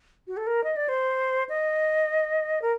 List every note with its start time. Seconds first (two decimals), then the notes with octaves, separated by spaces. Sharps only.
0.28 F#4
0.37 A4
0.47 A#4
0.64 D#5
0.76 D5
0.89 C5
1.49 D#5
2.62 A#4